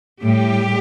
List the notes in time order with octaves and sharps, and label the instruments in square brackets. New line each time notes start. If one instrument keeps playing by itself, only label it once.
[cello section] A2 G3 G4